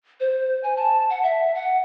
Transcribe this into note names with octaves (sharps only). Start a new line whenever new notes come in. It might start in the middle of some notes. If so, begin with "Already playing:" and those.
C5
G#5
A5
F#5
E5
F#5